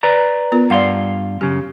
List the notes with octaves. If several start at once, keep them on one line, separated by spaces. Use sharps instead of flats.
B4 D5 A#5
B3 F4 A#4
G2 D5 F5 F#5 C6
F#2 C#3 G4